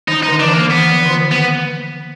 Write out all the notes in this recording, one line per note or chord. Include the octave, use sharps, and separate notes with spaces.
D#3 D#4
D#4
D3
E3 D4
D#3 A#3
E3 B3
F3
D3
D#3
B3